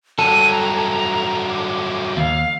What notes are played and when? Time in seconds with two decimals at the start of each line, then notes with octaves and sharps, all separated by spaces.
0.19 G2 F#3 A4 D#7
0.51 A#5
1.49 D6
2.17 D#2 F5